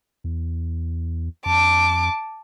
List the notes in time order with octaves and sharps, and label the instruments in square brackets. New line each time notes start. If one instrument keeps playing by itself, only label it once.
[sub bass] E2
[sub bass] F2 [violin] A5 D6